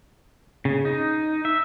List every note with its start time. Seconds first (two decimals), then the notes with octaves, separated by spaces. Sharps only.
0.65 C#3
0.85 D#4
1.45 E5